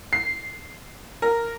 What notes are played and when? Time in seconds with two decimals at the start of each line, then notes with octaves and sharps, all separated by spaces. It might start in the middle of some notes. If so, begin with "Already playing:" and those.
0.13 C7
1.22 A#4